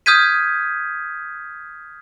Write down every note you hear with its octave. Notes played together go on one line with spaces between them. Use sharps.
D#6 F6 G6 G#6 B6 D#7